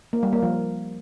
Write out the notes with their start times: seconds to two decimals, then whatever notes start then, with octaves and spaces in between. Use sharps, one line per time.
0.13 A#3
0.23 G3
0.33 A#3
0.42 F3